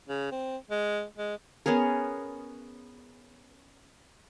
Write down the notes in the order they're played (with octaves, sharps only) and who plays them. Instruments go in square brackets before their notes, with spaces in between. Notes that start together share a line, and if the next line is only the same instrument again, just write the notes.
[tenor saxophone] C#3
C4
G#3
G#3
[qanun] B3 C#4 G#4 A#4